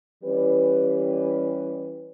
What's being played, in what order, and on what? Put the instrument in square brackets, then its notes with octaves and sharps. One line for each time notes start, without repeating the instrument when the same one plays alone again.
[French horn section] E3 G3 C#4 G4 B4